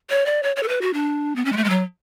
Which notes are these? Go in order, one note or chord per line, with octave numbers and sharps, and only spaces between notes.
C#5
D5
C#5
C#5
A4
B4
F#4
D4
B3
C#4
G#3
A3
G#3
F#3